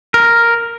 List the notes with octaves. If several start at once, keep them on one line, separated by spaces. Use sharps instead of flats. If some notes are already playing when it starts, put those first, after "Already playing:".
A#4